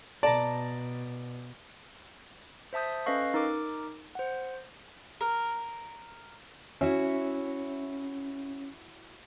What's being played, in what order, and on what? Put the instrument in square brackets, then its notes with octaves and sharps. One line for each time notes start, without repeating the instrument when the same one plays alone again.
[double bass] B2 [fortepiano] D5 [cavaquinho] A5 A#5
[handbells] C5 E5 A5 D#6 G6
C#4 A4 B4 D#5 F5 C#6
D#4 A#4 D6
C5 F#5
[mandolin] A#4
[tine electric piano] C#4 [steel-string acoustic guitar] E4 F#4 E5